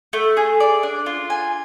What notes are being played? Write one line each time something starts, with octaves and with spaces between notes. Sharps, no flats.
A3
G#4
D5
D4
F4
G#5